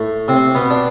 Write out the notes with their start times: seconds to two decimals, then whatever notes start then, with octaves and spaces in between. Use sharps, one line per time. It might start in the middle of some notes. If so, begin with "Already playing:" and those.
Already playing: A2 A3
0.28 C3 C4
0.55 B2 B3
0.71 D4